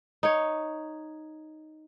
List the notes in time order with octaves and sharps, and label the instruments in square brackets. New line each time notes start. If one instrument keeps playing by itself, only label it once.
[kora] D#4 C#5